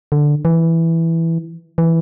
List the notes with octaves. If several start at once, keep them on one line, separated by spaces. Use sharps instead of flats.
D3
E3
E3